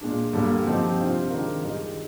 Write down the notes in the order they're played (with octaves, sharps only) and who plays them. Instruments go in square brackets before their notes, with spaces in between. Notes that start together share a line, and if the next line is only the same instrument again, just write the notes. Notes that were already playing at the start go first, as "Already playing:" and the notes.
[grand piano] A#2 G#3 D4
G2 D3 G3 A#3
F3 C4 D#4 G4
C3 G3 D4 F4 C5
D#3 G#3 D4 F4 A#4
G2 D#3 G#3 D#4 G4